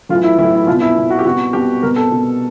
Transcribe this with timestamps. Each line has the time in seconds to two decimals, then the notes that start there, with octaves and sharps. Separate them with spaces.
0.09 B1 A2 E3 F4
0.24 E4
0.38 B1 A2 E3 E4
0.55 E4
0.67 C2 B2 F4
0.82 E4
0.96 C2 B2
1.10 F#4
1.19 G4
1.25 C2 B2 F#4
1.53 C2 B2 G4
1.82 C2 B2 A#4
1.96 A4
2.11 C2 B2